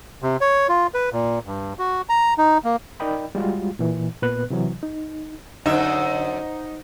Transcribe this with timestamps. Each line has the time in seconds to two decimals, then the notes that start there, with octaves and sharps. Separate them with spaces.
0.22 C3
0.41 C#5
0.69 F4
0.94 B4
1.13 A#2
1.47 G2
1.79 F#4
2.09 A#5
2.38 D#4
2.64 A#3
3.00 D#4 A#4 D5 D#5 G5 B5
3.35 G3 G#3 F4 F#4
3.79 A#2 E3
4.22 A#2 B3 B4 F#6
4.50 C3 E3 F#3
4.83 D#4
5.66 F#2 D3 D#4 C5 E5 F#5 C#6